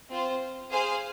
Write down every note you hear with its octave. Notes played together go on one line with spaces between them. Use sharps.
C4 F4 C5
G#4 C5 F5 G#5